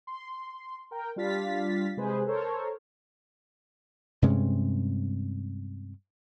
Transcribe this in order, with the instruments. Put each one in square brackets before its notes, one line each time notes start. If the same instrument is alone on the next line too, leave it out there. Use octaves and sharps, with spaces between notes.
[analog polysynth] C6
A#4 G5
G3 D4 F4 F5 A6 B6
C3 G#3 G#4 B4 C5
A4 A#4 C5 C#5
[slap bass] G2 C3 G#3 C#4